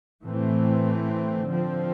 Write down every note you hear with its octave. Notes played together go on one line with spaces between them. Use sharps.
A2 E3 A3 C4
D3 F3 C4